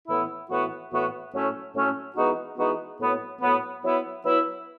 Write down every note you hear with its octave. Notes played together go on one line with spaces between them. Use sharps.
A2 E3 B3 E4
A2 E3 B3 F#4
A2 E3 B3 F#4
A2 F#3 A3 C#4
A2 F#3 A3 C#4
E3 G#3 B3 D#4 F#4
E3 G#3 B3 D#4 F#4
A2 F#3 B3
A2 F#3 B3
F#3 B3 E4
F#3 B3 E4